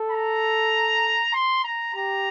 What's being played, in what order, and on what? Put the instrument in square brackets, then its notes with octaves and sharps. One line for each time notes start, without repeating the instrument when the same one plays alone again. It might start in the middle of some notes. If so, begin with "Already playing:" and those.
Already playing: [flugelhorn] A4
[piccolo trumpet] A#5
C6
A#5
[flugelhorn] G4 [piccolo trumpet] A#5